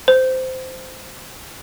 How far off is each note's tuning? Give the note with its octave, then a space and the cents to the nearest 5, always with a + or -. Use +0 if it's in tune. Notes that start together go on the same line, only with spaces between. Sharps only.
C5 -15